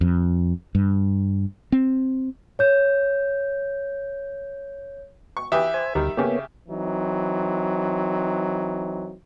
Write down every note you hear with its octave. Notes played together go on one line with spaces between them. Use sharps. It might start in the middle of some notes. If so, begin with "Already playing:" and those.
F2
G2
C4
C#5 G6
C#6
E3 G4 E5 D#6
C5 G#5
D2 D#3 G3
C#3 A#3 B3 G4 C#5
E3 F#3 C4 D#4